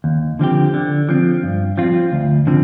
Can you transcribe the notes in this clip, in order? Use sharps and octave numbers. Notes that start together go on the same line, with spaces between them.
D#2
D3 F3 C4 G4
D3
F3 C4
G2
F3 C4 F4
D2
D3 F3 C4